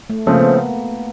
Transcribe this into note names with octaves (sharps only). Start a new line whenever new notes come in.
A3
C#3 F3 A3 A#3 C4
B3